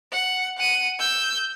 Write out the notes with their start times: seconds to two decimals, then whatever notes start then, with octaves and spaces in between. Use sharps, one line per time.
0.12 F#5
0.58 F#5 D#7
0.99 E6 G6